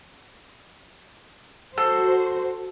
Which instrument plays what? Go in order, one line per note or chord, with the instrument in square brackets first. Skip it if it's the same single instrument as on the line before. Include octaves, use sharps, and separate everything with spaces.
[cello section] F#4 C5 [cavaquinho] A4